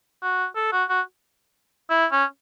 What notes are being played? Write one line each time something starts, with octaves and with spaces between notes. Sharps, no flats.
F#4
A4
F#4
F#4
E4
C#4